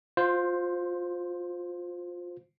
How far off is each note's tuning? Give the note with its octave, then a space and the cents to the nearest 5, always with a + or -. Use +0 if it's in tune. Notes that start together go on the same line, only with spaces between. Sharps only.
F4 +20 C5 +0